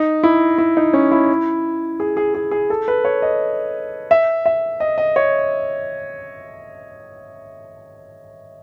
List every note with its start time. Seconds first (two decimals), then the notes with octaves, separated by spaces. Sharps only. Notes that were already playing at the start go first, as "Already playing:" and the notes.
Already playing: D#4
0.23 E4
0.58 E4
0.77 D#4
0.93 C#4
1.12 E4
2.00 G#4
2.17 G#4
2.34 G#4
2.51 G#4
2.70 A4
2.88 B4
3.05 C#5
3.22 D#5
4.11 E5
4.46 E5
4.80 D#5
4.98 D#5
5.16 C#5